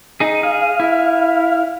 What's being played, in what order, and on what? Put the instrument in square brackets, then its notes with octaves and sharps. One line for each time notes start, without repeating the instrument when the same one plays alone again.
[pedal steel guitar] D#4 G#4
[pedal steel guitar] G#4 [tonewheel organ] F5
[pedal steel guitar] E4